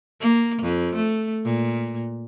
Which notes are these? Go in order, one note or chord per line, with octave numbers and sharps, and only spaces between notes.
A#3
F2
A3
A#2